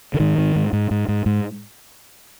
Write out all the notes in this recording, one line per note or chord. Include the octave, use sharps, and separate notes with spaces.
D3
G#2 D#3
G#2
G#2
G#2
G#2
G#2
G#2